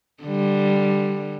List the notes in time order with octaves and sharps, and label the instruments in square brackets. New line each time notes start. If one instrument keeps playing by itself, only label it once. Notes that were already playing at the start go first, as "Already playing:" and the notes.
[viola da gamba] D3 G3